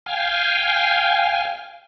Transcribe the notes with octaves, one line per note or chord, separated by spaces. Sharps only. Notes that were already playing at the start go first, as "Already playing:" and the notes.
F5 G5 G#5